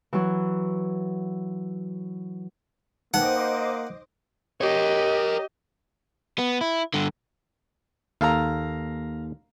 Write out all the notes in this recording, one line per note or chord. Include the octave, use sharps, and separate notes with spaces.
E3 F#3
A#3 D#4 B4 C5 D#5 F#5 G5 D6
G4 A#4 C#5 D#5
B3
E4
G2 D3
D#2 A4 F5 A#5